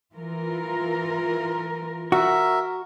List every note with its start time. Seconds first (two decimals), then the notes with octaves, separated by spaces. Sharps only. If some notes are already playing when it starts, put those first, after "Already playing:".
0.14 E3 F4 A#4
2.12 F#4 A#4 E5